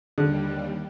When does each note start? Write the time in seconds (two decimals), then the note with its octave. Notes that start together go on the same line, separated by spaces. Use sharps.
0.18 D#2 D3 G3